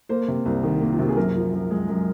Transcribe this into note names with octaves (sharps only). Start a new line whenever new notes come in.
A#3 C5
C3
C2
D#3
A#3
F4
C3 F#4
G#4
F#2 A#4
F3
F#2
G#3
F#2